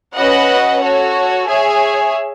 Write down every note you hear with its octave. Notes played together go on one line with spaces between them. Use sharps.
C#4 F#4 B4 D#5 F#5
F#4 A4 C#5
G#4 C#5 E5 G#5